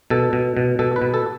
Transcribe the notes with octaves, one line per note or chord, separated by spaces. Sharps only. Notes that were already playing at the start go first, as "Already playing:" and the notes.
B2 A4
B2
B2
B2 A4
B4
B2
A4